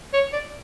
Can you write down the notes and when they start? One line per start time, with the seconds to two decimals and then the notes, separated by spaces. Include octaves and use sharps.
0.13 C#5
0.33 D5